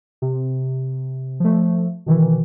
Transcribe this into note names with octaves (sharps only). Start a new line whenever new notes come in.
C3
F3 A3
B2 D#3 E3